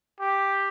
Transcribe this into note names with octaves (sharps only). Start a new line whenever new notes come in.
G4